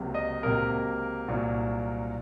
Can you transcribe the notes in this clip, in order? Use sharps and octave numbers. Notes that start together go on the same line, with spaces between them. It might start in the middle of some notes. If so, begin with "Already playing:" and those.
Already playing: C#2 C3 F#3 A#3
D#5
C#2 C3 F#3 A#3 A#4
C2 A#2 F#3